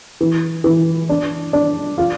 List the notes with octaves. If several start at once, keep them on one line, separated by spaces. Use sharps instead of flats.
E3
E3
D4
D4
F4